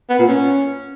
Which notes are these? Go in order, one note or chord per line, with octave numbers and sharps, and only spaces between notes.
B3
A#2
C#4